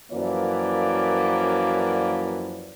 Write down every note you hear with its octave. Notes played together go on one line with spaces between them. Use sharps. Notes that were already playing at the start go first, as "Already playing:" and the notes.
F#2 E3 F3 A#3 D5